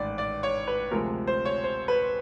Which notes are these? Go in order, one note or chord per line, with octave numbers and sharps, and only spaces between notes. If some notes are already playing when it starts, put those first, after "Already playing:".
Already playing: A1 G#2 D#3 D5
D5
C#5
B4
D2 C3 F3 G#3 A#4
C5
C#5
C5
B4